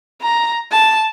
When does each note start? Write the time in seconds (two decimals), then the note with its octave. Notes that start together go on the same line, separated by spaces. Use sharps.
0.22 A#5
0.71 A5